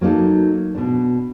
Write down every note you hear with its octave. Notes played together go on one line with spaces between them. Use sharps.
F#3 A#3 B3 D#4 A4
B2 D4